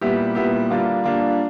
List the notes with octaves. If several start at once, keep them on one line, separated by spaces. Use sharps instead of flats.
A#2 G3 B3 E4 G4
A#2 G3 B3 E4 G4
D3 G3 A#3 D4 F4
D3 G3 A#3 D4 F4